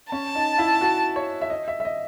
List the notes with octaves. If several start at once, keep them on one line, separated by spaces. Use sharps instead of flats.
C#4 A5
D#4
E4
F#4
C#5
E5
D#5
E5
E5
D#5